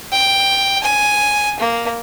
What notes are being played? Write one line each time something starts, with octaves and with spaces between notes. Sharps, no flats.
G5
G#5
A#3